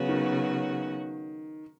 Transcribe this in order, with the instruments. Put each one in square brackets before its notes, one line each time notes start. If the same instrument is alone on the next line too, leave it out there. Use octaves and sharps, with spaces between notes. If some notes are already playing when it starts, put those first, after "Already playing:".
Already playing: [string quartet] C#3 F#3 B3 F#4
[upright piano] D#3